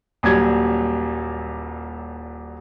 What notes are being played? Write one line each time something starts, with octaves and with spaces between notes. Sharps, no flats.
D#1 A#2 F#3 G3 G#6